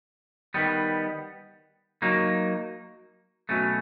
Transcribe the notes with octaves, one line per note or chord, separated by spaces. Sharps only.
D#3 G3 B3
F#3 A#3 D#4
B2 F#3 A3 C#4